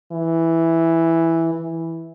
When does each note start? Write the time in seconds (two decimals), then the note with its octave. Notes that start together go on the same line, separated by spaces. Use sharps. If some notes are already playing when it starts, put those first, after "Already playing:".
0.12 E3
1.53 E3